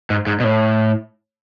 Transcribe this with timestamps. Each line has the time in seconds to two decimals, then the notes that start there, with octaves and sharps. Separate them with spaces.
0.10 G#2
0.27 G#2
0.40 B2
0.44 A2